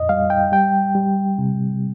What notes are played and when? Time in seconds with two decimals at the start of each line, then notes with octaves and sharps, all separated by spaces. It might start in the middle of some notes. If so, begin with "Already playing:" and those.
Already playing: F2 D#5
0.09 G3 F5
0.30 G5
0.52 G3 G5
0.95 G3
1.39 C3